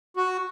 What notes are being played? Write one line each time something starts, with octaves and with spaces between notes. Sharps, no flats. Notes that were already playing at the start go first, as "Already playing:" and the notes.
F#4